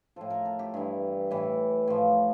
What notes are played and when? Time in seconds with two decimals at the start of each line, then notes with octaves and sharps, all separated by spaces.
0.16 A2 F3 A4
0.30 A#4
0.45 A4
0.59 G4
0.74 G2 E3
1.31 A2 E3
1.88 A2 F3